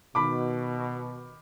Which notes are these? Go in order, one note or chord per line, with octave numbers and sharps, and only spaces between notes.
B2 D#3 B5 D6